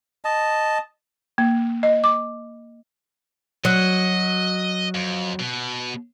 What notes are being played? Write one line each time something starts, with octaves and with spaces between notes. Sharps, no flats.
D#5 A5
A#3
D#5
D6
F#3 D#5
F2
B2